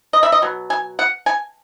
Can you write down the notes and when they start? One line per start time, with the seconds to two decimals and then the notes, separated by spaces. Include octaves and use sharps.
0.13 D#5
0.23 E5
0.32 D#5
0.42 B2 F#3
0.70 G#5
0.99 F#5
1.26 G#5